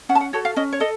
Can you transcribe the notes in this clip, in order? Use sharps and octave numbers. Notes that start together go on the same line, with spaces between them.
C#4 F#5
A5
F#5
F#4 A4 C#5
F5
C#4 D#5
C#5
A4 D#5